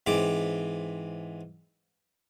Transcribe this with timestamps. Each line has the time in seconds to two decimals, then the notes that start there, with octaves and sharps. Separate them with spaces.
0.07 G#2 E3 C4 D6